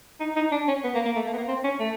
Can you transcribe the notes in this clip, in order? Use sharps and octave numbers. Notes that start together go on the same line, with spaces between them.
D#4
D#4
D4
C#4
B3
A#3
A#3
A3
A#3
B3
A#3
C4
C#4
A3